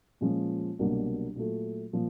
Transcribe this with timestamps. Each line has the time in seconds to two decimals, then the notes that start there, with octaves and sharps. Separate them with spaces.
0.21 A#2 F3 G#3 C#4
0.79 C2 B2 F#3 A#3 D4
1.36 A#2 F#3 A3
1.93 A#2 F3 A#3